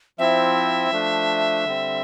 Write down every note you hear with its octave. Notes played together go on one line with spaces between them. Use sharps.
F3 C4 E4 E5
F3 A3 D4
D3 G3 C4